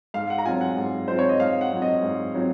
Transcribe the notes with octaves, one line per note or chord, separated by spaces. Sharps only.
G#2 F5
F#5
A#5
F#3 C4 F4 G#5
F#5
G#2
F#3 C4 F4 C5
C#5
D#5
G#2 F5
F#5
F#3 C4 F4
D#5
G#2
F#3 C4 F4